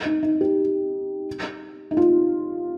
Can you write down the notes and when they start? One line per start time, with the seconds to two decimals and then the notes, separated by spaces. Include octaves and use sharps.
0.06 D#4
0.23 D#4
0.41 G4
1.91 D#4
1.97 F4